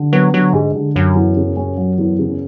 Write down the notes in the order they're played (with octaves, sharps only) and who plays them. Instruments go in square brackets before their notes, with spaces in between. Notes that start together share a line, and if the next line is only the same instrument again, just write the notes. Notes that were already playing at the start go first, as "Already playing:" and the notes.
Already playing: [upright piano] D3
[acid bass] F#3 [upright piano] B3
[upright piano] D3 [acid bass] F#3
[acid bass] G#2 [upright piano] G#3
[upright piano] D3
[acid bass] F#2 [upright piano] F#3
[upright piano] E2
C#3
C#4
F#3
E2
C#3